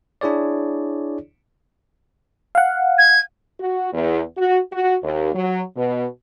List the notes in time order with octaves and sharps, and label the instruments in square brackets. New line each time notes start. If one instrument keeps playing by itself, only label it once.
[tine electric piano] D4 E4 G#4 C#5 D5
[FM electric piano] F5 F#5
[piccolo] G#6
[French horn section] F#4
E2
F#4
F#4
D#2
F#3
B2